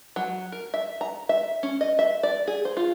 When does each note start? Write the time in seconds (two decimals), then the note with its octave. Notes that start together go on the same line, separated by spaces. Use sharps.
0.16 F#3
0.52 A#4
0.74 E5
1.01 A#5
1.29 E5
1.63 C#4
1.81 D#5
1.99 E5
2.23 D5
2.48 G#4
2.65 C5
2.77 F4